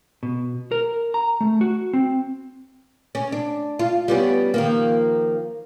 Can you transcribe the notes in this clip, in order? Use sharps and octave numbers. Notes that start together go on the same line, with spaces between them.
B2
A#4
A#5
A3
F#4
C4
C#4
D4
F4
G3 B3 C#4
D#3 F3 A#3